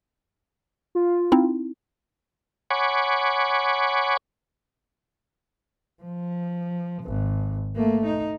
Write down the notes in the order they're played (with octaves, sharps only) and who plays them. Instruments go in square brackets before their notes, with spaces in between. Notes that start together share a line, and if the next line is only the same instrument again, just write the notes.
[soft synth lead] F4
[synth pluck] C4 D#4 E4
[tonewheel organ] C#5 F#5 G#5 B5 C#6 D6
[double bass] F3
G#1
A3 A#3
D#4